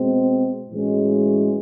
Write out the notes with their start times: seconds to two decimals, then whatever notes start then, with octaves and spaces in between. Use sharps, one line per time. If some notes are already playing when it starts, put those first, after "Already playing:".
Already playing: B2 G#3 C4
0.70 A2 E3 G#3 C#4 F#4